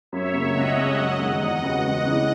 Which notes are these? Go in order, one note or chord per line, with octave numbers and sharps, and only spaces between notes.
F#2 C#5 E5
C#3 F#3 A#3
C#2 D#5 F#5
C#3 G#3 C#4
F#2
D#3 G#3 D#4 F#4
E2 D#5 F#5
C#3 G#3 B3 F#4
C#2 D#5 F#5
C#3 E3 G#3